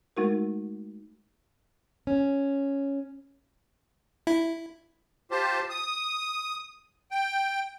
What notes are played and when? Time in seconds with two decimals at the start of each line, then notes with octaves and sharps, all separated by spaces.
0.17 G#3 A3 D#4 F#4 A#4
2.07 C#4
4.27 E4
5.31 F4 G4 C5 A5
5.70 D#6
7.11 G5